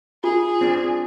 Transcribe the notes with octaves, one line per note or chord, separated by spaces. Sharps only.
F4 G#4
C4 D4